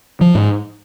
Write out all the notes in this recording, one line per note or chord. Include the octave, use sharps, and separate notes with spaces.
F3
G#2